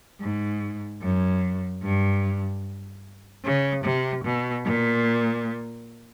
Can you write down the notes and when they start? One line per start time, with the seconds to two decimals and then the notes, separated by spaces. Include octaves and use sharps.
0.21 G#2
1.02 F#2
1.83 G2
3.44 C#3
3.84 C3
4.24 B2
4.65 A#2